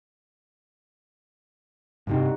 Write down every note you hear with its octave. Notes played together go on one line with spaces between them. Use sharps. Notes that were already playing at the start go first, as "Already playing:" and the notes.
G2 C3 G3 C4 D#4 F#4